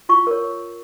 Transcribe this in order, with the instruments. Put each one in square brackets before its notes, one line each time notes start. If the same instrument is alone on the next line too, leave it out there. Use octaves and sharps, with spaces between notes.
[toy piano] F4 C#6
A#4 C#5